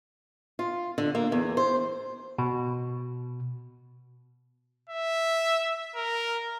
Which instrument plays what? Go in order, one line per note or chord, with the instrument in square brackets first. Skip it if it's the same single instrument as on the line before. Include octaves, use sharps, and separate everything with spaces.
[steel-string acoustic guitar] F4
D3
A#3
E2
C5
[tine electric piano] B2
[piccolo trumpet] E5
A#4